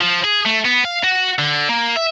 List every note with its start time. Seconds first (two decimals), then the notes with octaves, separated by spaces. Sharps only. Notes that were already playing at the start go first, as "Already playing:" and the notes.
0.01 F3
0.24 G#4
0.45 A3
0.65 B3
0.85 F5
1.04 F#4
1.39 D3
1.69 A#3
1.96 E5